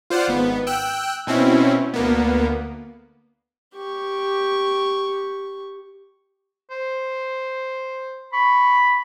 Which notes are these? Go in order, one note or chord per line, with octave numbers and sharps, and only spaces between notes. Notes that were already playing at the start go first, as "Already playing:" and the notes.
F4 C5 D5 F#5
G#1 B3
G5 E6 F#6
B2 C4 C#4 E4
D2 A#3 B3
G4 C#6
C5
B5 C#6